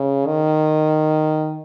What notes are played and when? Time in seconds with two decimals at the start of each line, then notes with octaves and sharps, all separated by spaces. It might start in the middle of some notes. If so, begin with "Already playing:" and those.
Already playing: C#3
0.27 D#3